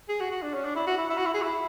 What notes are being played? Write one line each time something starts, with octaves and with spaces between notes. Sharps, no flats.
G#4
F#4
F#4
D4
C#4
D4
E4
F#4
E4
E4
F#4
E4
G#4
E4